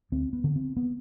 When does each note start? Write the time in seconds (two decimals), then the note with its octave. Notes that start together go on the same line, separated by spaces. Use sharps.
0.12 D2 C4
0.33 B3
0.44 D3
0.56 C4
0.77 B3